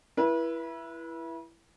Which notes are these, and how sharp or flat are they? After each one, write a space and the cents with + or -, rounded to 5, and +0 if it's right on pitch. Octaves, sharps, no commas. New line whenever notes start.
E4 +15 B4 -30